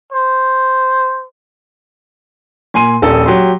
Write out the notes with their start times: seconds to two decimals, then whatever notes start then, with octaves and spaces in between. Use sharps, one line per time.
0.12 C5
2.74 A#2 G#5 C6 D#7
3.02 D#1 A#1 A4
3.26 F#3 G4 C6